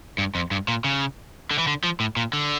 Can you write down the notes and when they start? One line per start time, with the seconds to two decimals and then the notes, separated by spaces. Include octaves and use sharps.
0.18 G2
0.35 F2
0.51 G2
0.68 A#2
0.84 C#3
1.51 D3
1.58 E3
1.67 D3
1.84 F3
2.00 A2
2.16 A#2
2.33 D3